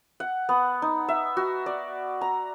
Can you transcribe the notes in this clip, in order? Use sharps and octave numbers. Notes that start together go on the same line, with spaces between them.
F#5
B3
D#4
E5
F#4
D5
A#5